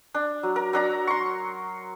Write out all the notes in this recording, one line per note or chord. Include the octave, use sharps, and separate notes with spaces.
D4
F#3
A#4
F#3 D4 A#5
C6 C#6